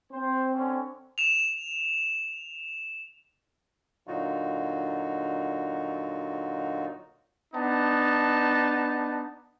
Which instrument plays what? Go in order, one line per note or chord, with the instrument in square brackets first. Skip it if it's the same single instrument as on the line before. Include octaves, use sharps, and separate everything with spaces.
[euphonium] C4 [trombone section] C5
[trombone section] D3 C#4
[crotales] E7 F7
[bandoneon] A#2 D3 F#3 D#4 F4 F#4
[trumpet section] B3 D4 D#4 A5